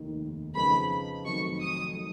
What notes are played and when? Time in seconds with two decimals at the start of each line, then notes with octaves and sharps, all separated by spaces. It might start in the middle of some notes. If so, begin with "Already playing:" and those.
Already playing: F1 D#2 D#3
0.55 F2 C#3 F3 B3 D#4 B5
1.25 F1 F2 D#3 F#3 C#6
1.61 D#6
1.96 D#3 F#3